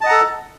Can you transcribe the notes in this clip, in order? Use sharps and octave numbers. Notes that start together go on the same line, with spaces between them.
A4 D#5 F#5 A5 A#5